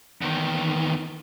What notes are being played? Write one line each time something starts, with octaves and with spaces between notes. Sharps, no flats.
E2 D#3